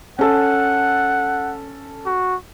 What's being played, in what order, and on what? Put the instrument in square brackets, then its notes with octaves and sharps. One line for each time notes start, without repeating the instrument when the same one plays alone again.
[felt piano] C#4 A4 [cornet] F#5
[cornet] F#4